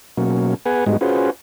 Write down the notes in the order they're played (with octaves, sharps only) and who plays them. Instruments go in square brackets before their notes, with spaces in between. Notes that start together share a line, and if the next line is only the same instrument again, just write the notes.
[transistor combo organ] B2 F#3 A#3 C#4
B3 G#4 B4 F#5 G#5
G#2 G3 G#3 B3 D#4 F#4
C#4 F4 F#4 G#4 B4 C5